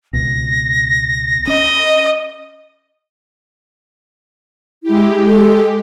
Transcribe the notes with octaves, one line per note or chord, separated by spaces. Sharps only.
C#2 B2 A#6
C#4 D#5
G#3 E4 G4
A4